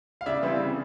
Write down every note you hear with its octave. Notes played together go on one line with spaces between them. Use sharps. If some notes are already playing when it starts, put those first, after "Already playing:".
F5
C#3 D5 E5
E3 G3 C4
C#3